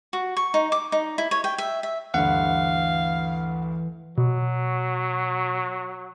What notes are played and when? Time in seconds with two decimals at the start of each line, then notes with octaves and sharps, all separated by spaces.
0.13 F#4
0.37 C#6
0.54 D#4
0.72 D6
0.92 D#4
1.18 E4
1.31 C#5
1.44 G5
1.58 E5
1.83 E5
2.14 D2 G2 E3 F5 F#5
4.18 B2 F#3